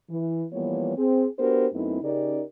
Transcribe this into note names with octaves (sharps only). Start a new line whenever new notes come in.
E3
E3 F3 G3 A#3 B3 C#5
C4 G#4
B3 D4 F#4 G4 A#4 C5
F#2 A3 B3 C4 D#4 E4
C#3 C#4 D#4 G4 A#4 D5